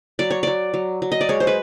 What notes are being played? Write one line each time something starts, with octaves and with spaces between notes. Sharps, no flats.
F#3 D5
C#5
F#3 D5
F#3
F#3
D#5
D5
G#3 C#5
C5
B4